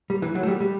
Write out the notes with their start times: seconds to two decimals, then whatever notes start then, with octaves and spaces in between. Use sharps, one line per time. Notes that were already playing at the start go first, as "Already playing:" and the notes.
0.10 G3
0.22 E3
0.35 F#3
0.43 A3
0.47 G3
0.60 G3